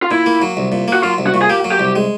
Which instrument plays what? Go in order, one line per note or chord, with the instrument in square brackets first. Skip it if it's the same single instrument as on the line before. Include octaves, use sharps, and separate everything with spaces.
[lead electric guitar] F4
[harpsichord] A#2 [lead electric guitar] E4
[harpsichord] A#3
F#3
C2
A#2
A#3
[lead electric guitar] F#4
[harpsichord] F#3 [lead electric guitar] F4
[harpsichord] C2
[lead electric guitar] F#4
[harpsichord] A#2
[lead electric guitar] G#4
[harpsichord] A#3 [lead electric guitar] G4
[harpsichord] F#3
[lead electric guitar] G4
[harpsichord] C2
G#3